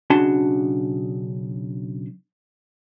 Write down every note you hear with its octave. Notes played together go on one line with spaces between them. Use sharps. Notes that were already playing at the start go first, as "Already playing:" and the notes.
B1 C#3 D4 F#4 A5 C6